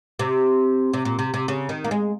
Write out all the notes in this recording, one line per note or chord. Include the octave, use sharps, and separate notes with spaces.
C3
C3
A#2
C3
C3
C#3
D#3
A#3
G#3